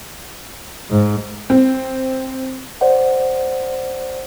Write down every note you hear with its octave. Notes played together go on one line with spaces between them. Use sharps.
G#2
C4
C5 D5 F#5